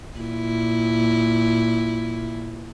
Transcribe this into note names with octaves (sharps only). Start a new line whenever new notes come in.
A#2 E4